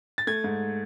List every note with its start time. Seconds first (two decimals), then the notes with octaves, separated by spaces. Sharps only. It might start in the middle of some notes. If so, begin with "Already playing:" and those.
0.18 A6
0.27 A3 G#6
0.44 G#2